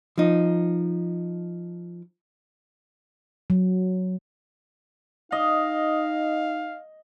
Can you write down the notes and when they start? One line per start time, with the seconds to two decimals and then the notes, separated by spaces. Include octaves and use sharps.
0.18 F3 D#4
3.50 F#3
5.32 D#4 D#5 F5